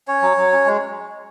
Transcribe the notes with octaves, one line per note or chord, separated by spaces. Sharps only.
C#4 C#5
F#3
F#3
C#4
G#3